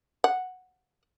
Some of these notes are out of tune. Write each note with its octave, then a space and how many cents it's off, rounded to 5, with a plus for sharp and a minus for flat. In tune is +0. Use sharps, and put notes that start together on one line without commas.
F#5 -5